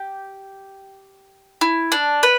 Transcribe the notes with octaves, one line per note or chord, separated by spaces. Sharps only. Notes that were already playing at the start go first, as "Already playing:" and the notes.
Already playing: G4
E4
D4
B4